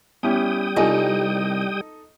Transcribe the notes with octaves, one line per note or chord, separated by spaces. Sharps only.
G3 B3 C#4 E4 G4 G5 D#6
C2 D#4 F4 A4 D#5 G#5